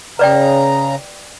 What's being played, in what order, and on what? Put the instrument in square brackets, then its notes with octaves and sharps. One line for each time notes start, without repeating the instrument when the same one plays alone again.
[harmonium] C#3 A#5 [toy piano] B4 D5 G5